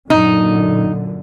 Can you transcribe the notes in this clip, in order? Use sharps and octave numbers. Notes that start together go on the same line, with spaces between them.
F#2 A#2 D3 D#4